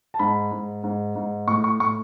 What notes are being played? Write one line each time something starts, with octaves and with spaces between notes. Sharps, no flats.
A5
G#2 B5
G#2
G#2
G#2
A2 C#6
C#6
A2 C#6